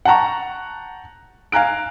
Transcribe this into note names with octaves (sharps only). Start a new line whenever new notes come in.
F#5 G5 A5 A#5 C#6
F5 G#5 A#5 F#6 D7